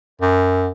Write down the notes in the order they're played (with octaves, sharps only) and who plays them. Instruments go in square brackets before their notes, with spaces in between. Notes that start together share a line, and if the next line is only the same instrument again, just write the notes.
[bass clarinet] F#2